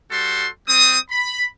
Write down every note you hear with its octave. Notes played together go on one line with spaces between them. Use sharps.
G3 F#4 A4 C6
G3 C4 D#6
B5